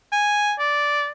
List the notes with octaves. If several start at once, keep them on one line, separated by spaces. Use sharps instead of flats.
G#5
D5